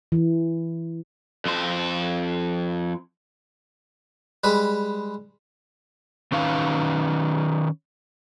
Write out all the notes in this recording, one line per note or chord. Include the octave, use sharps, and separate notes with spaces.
E3
F2 C5
G3 G#3 B4
D#3 C#4 D#4 B4 F5